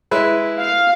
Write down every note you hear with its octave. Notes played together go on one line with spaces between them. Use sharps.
G#3 E4 B4
F5